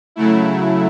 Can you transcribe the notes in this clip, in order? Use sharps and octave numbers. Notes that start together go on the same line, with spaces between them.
C#3 F#3 A3 E4